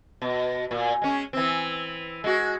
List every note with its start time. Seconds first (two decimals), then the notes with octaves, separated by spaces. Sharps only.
0.22 B2
0.71 A#2
1.02 G#3 C#4
1.33 E3 C4
2.24 G#3 F#4